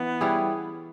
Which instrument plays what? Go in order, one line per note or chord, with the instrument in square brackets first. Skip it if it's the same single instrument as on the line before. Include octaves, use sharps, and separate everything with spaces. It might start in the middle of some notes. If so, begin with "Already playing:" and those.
Already playing: [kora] E3 [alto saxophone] B3
[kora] G3 C#4 E4 G#4